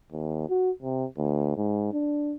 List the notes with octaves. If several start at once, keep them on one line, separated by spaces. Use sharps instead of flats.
D#2
F#4
C3
D2
G#2
D4